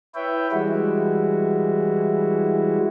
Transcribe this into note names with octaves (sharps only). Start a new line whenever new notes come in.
E4 B4 C#5 E5 G5
E3 G3 G#3 E4 F#4